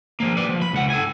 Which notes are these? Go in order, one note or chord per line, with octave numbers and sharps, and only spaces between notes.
F3 A#3
B4 D5
F3
B5
C#2 F#5
A4 G#5